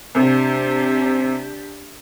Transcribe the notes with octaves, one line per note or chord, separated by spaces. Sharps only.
C3 D4 G4